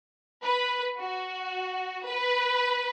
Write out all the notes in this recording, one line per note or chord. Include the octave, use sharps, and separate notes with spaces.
B4
F#4
B4